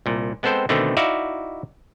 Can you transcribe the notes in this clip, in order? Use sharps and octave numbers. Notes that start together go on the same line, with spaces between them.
C2 A#2
G#3 B3 C4 A4 C5 G5
B2 D3 D#3 A3 C4
D#4 E4 F#4 D5 E5 F5